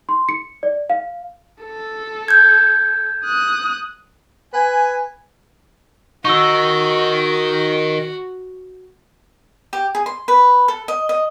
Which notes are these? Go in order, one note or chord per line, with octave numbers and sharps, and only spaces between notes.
C6
C#7
D5
F5
A4
G6 G#6
D#6 F#6
B4 G#5
D#3 D#4 F#4 C#6 E6
G4
G#4
C6
B4
A4
D#5
D#5